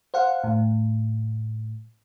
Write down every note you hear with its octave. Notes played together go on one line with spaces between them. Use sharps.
C5 F5 F#5
A2